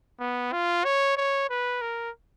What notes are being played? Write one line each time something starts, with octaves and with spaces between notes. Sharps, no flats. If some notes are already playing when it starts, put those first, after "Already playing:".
B3
F4
C#5
C#5
B4
A#4